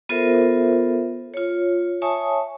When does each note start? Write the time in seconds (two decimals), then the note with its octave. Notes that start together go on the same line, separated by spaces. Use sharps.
0.09 B3 F4 A4 A#4 C5 E5
1.34 F4 C#5
2.02 C#5 E5 G#5 A5 C#6 D#6